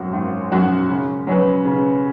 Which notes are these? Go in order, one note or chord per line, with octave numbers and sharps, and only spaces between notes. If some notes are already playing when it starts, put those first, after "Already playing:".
Already playing: G#1 F#2 F#3 C#4 F#4
G#1
F#2 F#3 C#4 F#4
C#3
F#3 C#4 B4
C#3